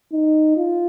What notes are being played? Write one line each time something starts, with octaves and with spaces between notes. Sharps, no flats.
D#4
F4